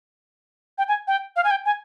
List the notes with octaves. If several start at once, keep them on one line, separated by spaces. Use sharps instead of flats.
G5
G#5
G5
F5
G#5
G5
G#5